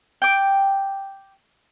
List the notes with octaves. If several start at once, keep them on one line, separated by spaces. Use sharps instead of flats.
G5 D6